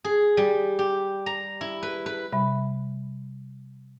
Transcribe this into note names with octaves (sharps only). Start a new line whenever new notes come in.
G#4
G3
G4
A#5
E4
B4
B4
C3 G3 E5 B5